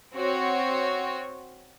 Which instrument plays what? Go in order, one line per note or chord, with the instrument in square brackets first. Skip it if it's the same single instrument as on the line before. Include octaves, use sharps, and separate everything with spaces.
[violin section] C4 F#4 C#5